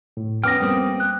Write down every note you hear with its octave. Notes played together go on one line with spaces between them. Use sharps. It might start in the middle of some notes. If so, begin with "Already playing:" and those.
A2
F2 B3 C#4 G5 D6 D#6 F6 A#6
G3 A#3 C4
F#6